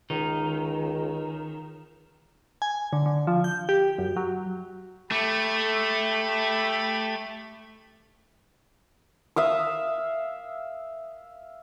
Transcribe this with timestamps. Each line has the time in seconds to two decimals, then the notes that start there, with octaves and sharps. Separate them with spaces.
0.10 C#2 D#3
2.62 G#5
2.93 D3
3.06 D3
3.27 F3
3.44 G6
3.69 G4
3.98 F#2
4.16 F#3
5.11 A3 G4 B5
9.36 E5 F5 D#6